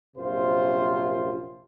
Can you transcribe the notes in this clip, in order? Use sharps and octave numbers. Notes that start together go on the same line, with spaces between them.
A#1 F#2 C3 F4 C5